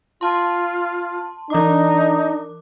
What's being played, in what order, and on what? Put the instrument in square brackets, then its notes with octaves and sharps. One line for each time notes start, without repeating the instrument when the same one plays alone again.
[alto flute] F4 [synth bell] A5 C6
[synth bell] E3 D6 [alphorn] D4 [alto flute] D#4